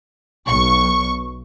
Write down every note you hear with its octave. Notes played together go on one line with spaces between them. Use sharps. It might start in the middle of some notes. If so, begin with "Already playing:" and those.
B1 C#6